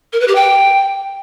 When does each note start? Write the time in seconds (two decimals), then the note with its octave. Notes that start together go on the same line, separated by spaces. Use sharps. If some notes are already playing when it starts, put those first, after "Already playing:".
0.13 A#4
0.20 B4
0.28 G4
0.35 G5